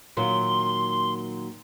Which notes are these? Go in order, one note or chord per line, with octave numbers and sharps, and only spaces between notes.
A#2 D#3 F#3 C6